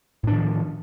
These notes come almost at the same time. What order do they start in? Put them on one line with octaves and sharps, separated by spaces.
A2 D4 D#3 F3